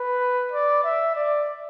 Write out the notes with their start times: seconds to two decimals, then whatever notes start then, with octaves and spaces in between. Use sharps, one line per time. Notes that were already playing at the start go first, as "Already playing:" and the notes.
Already playing: B4
0.52 D5
0.84 E5
1.16 D5